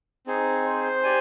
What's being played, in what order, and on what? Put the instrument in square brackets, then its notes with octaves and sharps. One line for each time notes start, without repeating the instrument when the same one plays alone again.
[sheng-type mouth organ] C4 D#4 G#4
[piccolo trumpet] C5
[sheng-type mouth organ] G4 D5 G#5